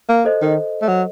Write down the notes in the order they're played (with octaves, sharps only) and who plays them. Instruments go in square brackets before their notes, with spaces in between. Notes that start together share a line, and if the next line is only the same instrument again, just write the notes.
[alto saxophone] A#3
[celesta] A4 C5 D#5
[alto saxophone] D#3
A3
F#3